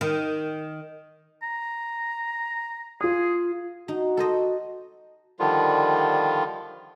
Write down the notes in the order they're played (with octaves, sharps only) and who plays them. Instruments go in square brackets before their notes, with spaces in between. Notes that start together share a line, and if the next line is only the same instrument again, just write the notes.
[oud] D#3
[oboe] A#5
[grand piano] F4 D#6 [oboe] G#4
[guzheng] D#4 [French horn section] F#4
[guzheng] A4 C5 D#5
[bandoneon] D3 D#3 F3 G3 F4